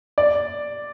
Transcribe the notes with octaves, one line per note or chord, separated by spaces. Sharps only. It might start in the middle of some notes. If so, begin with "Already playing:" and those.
D5